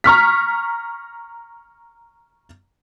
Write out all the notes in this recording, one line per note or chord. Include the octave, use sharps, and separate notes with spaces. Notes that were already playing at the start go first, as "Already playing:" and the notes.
A#5 C#6 F6 B6